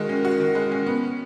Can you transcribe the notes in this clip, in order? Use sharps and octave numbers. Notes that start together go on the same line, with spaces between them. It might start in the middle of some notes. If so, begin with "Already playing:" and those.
Already playing: D#3 G#3 F#4
C#4
F#4
D#3
G#3
C#4
B3